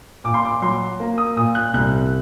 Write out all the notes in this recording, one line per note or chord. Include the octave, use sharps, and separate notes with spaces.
A#2 D6
C6
D6
F#3 C6
A#3
D#6
A#2 D#6
F#6
C2 F#6